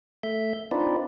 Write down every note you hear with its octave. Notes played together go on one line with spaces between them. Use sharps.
A3 E5 G6
C4 D4 D#4 F4 B4 D5